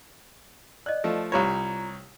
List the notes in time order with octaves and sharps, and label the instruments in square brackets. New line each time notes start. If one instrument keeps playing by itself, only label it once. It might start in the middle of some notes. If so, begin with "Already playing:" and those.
[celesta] D5 D#5 [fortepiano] F#6
[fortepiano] F3 A3
[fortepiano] C2 G3 C#5 [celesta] F4 A#5